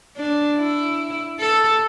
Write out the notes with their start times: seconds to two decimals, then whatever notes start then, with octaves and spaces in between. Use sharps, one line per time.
0.16 D4
0.58 E4
1.40 A4